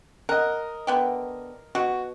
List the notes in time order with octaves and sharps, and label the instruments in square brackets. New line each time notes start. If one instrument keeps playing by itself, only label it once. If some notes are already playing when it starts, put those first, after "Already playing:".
[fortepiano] A#4 D#5 [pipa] F#5
[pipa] D3 B3 G4
[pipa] B2 [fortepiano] F#4